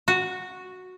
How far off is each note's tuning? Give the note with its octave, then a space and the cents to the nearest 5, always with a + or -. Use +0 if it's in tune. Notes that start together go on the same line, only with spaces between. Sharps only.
F#4 -5